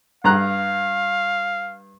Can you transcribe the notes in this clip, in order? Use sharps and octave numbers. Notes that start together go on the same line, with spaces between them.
G2 F5 A#5 F#6